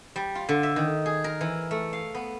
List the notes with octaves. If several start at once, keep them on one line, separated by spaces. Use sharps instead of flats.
G3
F4
D3
E5
D#3
G#4
A#4
E3
A3
F5
B3